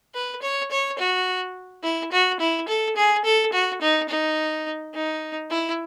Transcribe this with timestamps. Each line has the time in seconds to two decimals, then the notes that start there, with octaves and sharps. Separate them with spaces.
0.15 B4
0.42 C#5
0.71 C#5
0.99 F#4
1.83 E4
2.12 F#4
2.40 E4
2.68 A4
2.96 G#4
3.25 A4
3.53 F#4
3.82 D#4
4.09 D#4
4.95 D#4
5.51 E4